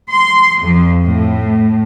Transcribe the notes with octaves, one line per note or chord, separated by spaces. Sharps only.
C6
F2
A2